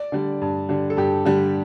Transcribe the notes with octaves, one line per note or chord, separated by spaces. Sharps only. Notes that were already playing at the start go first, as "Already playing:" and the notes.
Already playing: D5
D3 G3
G2
D3 G3
A4
G2 G4
D3 G3